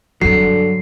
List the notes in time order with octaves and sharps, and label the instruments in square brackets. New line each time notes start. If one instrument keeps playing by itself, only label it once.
[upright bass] G2 C4 [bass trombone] D3 [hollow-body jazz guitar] F#3 [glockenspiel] C7